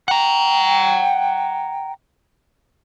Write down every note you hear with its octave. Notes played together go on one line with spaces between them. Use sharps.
F#5 G5 A#5